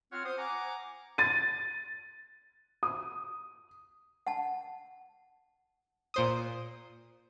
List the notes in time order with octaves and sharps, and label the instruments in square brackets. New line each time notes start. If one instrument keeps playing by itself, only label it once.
[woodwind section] C4 F4 C#5 F#5 F6
C5 D#6
F#5 G#5 A#5 D6
[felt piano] A6 D#7
D#6
[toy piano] F#5 A5
[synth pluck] A#2 C5 D#6